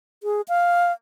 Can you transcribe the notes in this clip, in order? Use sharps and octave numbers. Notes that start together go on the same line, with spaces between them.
G#4
F5